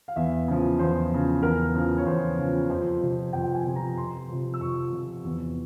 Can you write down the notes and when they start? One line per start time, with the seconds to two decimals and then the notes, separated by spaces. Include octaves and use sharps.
0.08 F5
0.16 E2 E5
0.48 C#3 F3
0.79 E2 C5
1.12 C#3 F3
1.43 E2 A#4
1.75 C#3 F3
1.98 C#5
2.07 E2 C5
2.38 C#3 F3
2.70 F2 C5
3.02 C3 F3
3.33 F2 G5
3.55 G#5
3.65 C3 F3
3.76 A#5
3.97 F2 C6
4.29 C3 F3
4.54 E6
4.60 F2 C#6
4.92 C3 F3
5.24 E2